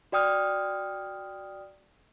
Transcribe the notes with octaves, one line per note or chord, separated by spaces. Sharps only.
F#4 D5 G5 D#6 F6